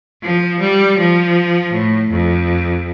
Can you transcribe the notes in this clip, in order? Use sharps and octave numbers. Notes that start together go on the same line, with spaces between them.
F3
G3
F3
A2
F2